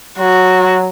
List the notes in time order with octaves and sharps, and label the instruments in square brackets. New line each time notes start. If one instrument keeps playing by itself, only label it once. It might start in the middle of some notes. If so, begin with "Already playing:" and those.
[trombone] F#3 [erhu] F#4